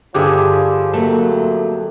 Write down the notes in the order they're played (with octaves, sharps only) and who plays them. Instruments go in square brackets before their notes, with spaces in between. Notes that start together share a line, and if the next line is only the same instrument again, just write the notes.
[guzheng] G2 D3 [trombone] F3 [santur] G4 G#4 E5
[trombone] F2 [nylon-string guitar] F#3 A#3 [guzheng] A3